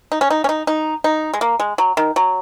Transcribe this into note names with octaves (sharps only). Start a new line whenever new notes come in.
D#4
C#4
D#4
C#4
D#4
D#4
D#4
G#3
A#3
G#3
F#3
D#3
F#3